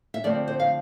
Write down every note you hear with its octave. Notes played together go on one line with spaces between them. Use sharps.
E5
D3 F3 A3 C4 D5
C5
F5